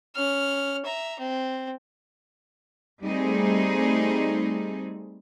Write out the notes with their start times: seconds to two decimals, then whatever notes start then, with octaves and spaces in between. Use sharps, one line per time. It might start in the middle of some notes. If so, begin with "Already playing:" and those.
0.15 C#4 F6
0.85 E5 A#5
1.19 C4
3.04 G3 A3 C4 D#4 G#4